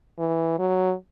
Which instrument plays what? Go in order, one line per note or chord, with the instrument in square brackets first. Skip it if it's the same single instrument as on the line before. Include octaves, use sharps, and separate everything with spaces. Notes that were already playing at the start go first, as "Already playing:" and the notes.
[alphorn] E3
F#3